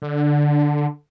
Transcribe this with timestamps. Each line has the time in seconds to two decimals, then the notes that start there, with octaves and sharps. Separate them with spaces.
0.02 D3